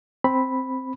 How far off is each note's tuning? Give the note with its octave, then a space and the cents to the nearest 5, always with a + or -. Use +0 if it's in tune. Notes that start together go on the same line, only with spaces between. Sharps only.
C4 +0 B5 +0